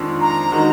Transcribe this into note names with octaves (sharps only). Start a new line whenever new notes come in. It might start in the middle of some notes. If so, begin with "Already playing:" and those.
Already playing: F2 D#3 G#3 D4
A#5
D#3 G#3 D#4 F#4